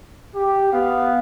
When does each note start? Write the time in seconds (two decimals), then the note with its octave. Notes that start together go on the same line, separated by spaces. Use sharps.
0.35 G4
0.72 B3 F5